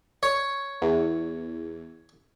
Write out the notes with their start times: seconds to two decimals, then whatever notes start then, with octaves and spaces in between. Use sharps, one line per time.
0.23 C#5
0.82 E2